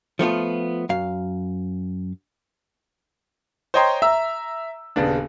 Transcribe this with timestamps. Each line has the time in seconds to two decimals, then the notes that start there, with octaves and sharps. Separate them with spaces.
0.19 F3 A3 B3 F4
0.89 F#2 F5
3.74 C5 C#5 D#5 G5 A#5 C6
4.02 E5 A#5 E6
4.96 D#1 C#3 B3 D4